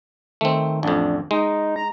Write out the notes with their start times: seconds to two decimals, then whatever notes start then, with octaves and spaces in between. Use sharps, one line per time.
0.41 D#3 A3 C4
0.83 A1 F2 D4
1.31 G#3 D#4
1.76 A#5